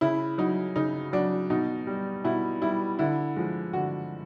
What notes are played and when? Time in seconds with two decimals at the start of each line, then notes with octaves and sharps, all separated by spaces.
0.01 C#3 E4
0.38 F#3 D#4
0.76 C#3 D#4
1.13 F#3 D4
1.50 B2 D#4
1.87 G3
2.24 B2 E4
2.61 G3 E4
2.99 D3 E4
3.36 F3 G#3
3.73 D3 F#4